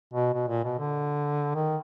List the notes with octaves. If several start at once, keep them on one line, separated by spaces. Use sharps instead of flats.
B2
B2
A#2
B2
D3
D#3